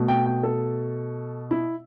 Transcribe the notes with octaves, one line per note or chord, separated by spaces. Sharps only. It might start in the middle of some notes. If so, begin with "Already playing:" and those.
Already playing: B2 A3
G5
G5
A4
E4